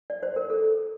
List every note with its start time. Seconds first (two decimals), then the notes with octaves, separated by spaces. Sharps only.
0.10 D5
0.23 C5
0.36 A#4
0.50 A4